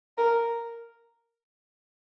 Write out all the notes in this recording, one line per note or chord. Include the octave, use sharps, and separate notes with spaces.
A#4